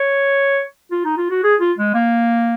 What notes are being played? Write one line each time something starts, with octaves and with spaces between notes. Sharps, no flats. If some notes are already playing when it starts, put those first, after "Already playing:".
Already playing: C#5
F4
D#4
F4
F#4
G#4
F4
G#3
A#3